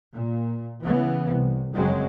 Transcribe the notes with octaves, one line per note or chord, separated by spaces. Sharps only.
A#2
C#3 E3 B3
C2
G1 F#2 C#3 F#3 G#3 C4